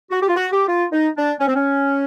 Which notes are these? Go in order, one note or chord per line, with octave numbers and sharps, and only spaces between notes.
F#4
G4
F4
F#4
G4
F4
D#4
D4
C#4
C4
C#4